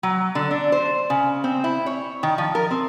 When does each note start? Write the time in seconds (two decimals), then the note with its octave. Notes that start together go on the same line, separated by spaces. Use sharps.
0.03 F#3
0.35 D3
0.51 D4
0.72 C5
1.10 C#3
1.44 C4
1.64 E4
1.86 C#5
2.23 D#3
2.38 F3
2.55 A#4
2.71 C4